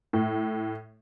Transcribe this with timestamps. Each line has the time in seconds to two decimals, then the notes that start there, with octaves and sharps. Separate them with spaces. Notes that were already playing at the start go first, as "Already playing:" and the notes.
0.13 A2